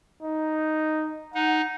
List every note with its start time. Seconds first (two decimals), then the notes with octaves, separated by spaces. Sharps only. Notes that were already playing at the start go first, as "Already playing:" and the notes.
0.22 D#4
1.34 D#4 F#5